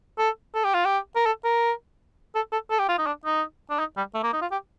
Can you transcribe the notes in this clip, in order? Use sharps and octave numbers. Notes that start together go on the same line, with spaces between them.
A4
A4
G4
F4
G4
A#4
A4
A#4
A4
A4
A4
G4
F4
D#4
D4
D#4
D4
D#4
G3
A3
A#3
D#4
F4
G4